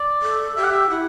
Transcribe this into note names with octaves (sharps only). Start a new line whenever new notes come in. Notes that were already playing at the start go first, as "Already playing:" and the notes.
Already playing: D5
A4
G4 E5
F#5
E5
E4 F#5